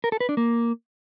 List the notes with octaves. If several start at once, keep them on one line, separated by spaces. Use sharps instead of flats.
A#4
A4
B4
D4
A#3